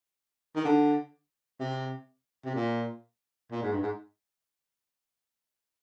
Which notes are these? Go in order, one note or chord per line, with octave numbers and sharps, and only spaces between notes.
D#3
D3
C3
C3
A#2
A#2
G#2
G2
G#2